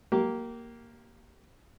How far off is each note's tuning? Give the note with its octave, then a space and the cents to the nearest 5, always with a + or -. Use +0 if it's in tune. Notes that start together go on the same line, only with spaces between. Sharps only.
A#3 +0 G4 -25